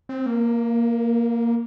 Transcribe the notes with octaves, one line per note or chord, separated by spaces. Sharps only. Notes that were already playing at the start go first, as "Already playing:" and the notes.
C4
A#3